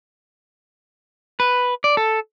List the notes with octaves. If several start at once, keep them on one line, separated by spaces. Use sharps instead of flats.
B4
D5
A4